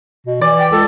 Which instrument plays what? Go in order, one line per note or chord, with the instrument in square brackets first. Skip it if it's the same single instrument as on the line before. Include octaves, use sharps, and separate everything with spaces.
[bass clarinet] B2
[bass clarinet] E3 [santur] D5
[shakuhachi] G5
[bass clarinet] C#2 [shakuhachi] A4